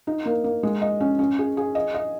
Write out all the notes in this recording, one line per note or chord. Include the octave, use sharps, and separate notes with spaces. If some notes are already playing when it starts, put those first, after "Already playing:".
D#4
A#3
A#3
G#3
D#5
C#4
C#4
G#4
G#4
D#5
D#5